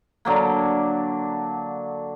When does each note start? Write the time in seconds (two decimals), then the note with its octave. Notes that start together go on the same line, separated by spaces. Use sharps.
0.25 D3 F#3 A#3